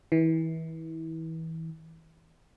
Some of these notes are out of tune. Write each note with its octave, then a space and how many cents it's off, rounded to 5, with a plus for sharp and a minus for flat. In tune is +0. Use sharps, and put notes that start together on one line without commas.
E3 -30